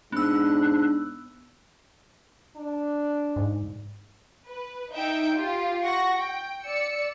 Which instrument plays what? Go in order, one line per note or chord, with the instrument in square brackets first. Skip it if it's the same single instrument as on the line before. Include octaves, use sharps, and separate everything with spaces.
[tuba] G#2 [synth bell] B3 E6 [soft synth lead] D4 [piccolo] F#6
[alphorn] D4
[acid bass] G#2
[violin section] B4
D#4 E5 G5 G6 D7
F4 G4
F#5 C#6 A#6
G5
D5 E6 C#7